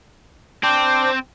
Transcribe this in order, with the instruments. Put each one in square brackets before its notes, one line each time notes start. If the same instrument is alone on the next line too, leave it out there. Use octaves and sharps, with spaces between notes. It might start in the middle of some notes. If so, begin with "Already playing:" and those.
[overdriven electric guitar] C4 [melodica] D4 C5